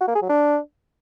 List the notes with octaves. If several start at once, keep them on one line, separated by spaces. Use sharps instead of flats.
F#4
A#3
G#4
F#3
D4